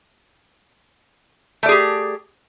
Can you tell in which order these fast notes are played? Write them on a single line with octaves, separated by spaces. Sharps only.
A3 D5 G#4 G4